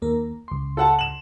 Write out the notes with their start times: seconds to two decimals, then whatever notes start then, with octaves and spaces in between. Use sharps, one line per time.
0.02 D#2 A#3 A#4
0.48 C#2 C6
0.77 A4 F#5 A5
0.99 E7 F#7